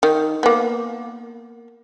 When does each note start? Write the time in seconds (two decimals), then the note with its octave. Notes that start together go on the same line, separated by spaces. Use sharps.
0.03 D#3
0.43 A#3 B3